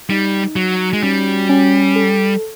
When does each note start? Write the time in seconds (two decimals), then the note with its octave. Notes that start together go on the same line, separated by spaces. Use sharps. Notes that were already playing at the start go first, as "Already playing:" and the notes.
0.10 G3 D#4
0.56 F#3 F#4
0.93 G#3
1.03 G3 C#4
1.49 C#4
1.96 A4